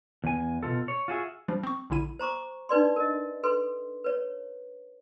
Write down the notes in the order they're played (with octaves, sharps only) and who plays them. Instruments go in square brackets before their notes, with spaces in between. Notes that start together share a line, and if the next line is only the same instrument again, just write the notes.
[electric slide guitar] E2 G#5
B2 D#3 F4 A4
C#5
F4 F#4 G#4 E5
[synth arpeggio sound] F3 G3 D4
C4 C#6
A#1 D3 E4 D#7
[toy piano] C5 A#5 C#6 D6
D4 D#4 B4 D5 C6
A#4 D#5
A4 B4 C6
B4 C#5